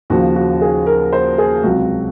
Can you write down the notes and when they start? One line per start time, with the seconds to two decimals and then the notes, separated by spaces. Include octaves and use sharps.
0.10 D#2 C#3 F3 F#4
0.36 F#4
0.61 G#4
0.86 A#4
1.13 C5
1.38 G#4
1.63 C#2 C3 F#3 F#4